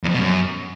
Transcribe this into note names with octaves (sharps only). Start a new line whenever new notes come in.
E2
F2
B2
F#2